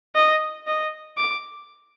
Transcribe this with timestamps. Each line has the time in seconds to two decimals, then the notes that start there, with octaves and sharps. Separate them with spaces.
0.15 D#5
0.67 D#5
1.18 D6